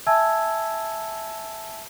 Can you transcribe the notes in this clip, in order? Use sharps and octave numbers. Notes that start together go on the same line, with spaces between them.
E5 G#5 A5 E6 G#6